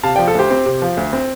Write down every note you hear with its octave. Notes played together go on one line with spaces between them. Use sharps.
C3 F5 A5
F3 D5 G5
A4
D2 G4 C5
C4
C3
F3
D2
C4